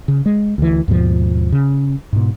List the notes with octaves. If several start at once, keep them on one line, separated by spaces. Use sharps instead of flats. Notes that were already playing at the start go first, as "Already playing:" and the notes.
C#3
G#3
D2 E3
D#2 G#2 B2 F3
C#3
G#2 B2